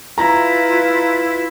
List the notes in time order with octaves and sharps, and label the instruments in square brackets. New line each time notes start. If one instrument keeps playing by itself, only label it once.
[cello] E4 [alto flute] F4 [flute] B4 [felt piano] A#5